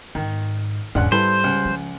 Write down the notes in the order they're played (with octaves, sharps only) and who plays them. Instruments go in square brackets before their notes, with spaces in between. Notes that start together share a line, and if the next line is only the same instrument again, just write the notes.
[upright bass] G#2 [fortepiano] D#3
[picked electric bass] E1 D4 [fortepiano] C#2 F#5 F#6 [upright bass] G#2
[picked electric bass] G3 [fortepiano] E4 A4 B4 [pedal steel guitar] C5
[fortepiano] C#2
[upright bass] F3